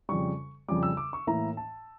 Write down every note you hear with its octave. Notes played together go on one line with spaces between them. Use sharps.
F2 C#3 G3 C#6
F2 C#3 G3 D6
E6
D6
C#6
A2 E3 A#3 E4 A#5
A5